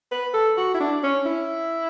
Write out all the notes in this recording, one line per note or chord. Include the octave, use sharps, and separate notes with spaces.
B4
A4
F#4
E4
D4
C#4
E4